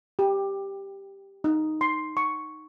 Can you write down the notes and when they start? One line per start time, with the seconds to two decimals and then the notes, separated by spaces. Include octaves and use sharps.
0.19 G4
1.44 D#4
1.81 C6
2.17 C#6